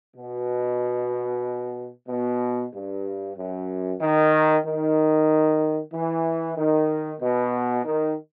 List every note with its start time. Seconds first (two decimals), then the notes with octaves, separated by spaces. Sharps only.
0.17 B2
2.08 B2
2.73 G2
3.37 F#2
4.01 D#3
4.65 D#3
5.94 E3
6.57 D#3
7.21 B2
7.85 D#3